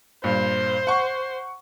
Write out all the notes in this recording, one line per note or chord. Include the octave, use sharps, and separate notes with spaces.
G2 A#2 C5
F#5 C#6